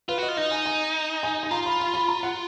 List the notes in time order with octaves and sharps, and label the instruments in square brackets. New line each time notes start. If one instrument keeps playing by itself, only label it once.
[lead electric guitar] F4 [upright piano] B4
[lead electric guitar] F#4 [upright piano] D#5
[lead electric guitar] F4
[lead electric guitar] D#4 [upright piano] D#5
[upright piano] G#5
G#5
G#5
G#5
[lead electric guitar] F4 [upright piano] A#5
[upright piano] B5
B5
B5
A#5
F#5